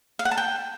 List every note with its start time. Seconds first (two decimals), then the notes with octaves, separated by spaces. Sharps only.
0.19 F5
0.25 F#5
0.31 A5
0.37 G5